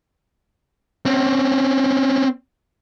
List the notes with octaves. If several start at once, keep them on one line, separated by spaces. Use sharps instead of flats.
C4 C#4